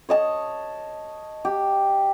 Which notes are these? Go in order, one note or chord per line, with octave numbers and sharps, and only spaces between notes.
C#5 D#5 A5
G4